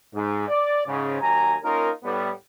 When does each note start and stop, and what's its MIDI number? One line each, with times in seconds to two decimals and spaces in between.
0.14 0.45 44
0.48 0.82 74
0.87 1.21 44
0.87 1.21 49
1.21 1.56 39
1.21 1.56 54
1.21 1.56 80
1.21 1.56 82
1.63 1.89 58
1.63 1.89 61
1.63 1.89 63
1.63 1.89 65
1.63 1.89 70
2.04 2.30 45
2.04 2.30 55
2.04 2.30 59